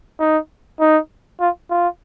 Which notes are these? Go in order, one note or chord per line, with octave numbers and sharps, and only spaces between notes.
D#4
D#4
F4
F4